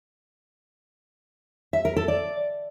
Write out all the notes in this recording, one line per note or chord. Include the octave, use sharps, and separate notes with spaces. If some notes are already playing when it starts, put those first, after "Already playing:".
E5
A#4
A4
D5